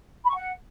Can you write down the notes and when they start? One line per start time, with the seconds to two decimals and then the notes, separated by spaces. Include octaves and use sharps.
0.23 B5
0.29 C#6
0.34 F#5